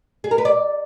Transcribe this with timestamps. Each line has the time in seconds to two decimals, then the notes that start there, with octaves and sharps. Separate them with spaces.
0.24 G#4
0.31 A#4
0.38 B4
0.45 D5